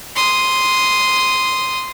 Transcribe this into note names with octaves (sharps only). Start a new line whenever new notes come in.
C6 D#6